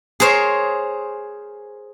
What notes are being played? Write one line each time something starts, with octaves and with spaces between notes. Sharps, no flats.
G#4 A#4 C5 C#5